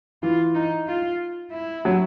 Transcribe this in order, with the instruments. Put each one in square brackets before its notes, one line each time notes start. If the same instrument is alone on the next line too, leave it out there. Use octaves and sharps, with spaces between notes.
[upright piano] E3 [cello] F4
[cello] D#4
F4
E4
[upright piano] F#3